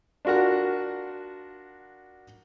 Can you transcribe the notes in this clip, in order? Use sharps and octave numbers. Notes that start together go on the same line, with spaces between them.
D4 F4 F#4 A#4 F#5